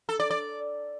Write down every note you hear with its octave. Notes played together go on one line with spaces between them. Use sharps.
A4
D5
D5